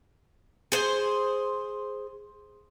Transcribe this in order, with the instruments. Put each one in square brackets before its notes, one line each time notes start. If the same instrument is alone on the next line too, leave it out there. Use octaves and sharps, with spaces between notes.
[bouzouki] G#4 C5